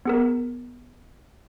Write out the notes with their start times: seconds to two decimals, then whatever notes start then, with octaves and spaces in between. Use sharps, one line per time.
0.05 B3 G#4 A#4